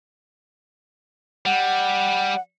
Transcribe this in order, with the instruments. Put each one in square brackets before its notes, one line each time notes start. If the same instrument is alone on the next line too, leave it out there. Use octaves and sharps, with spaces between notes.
[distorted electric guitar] G3 [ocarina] F#5